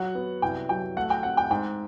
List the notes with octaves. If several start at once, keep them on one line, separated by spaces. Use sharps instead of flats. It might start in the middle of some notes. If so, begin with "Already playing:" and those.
Already playing: F#3 F#5
B3
C2 G5
F#3 G5
A3 F#5
G5
C4 F#5
G5
G#2 G5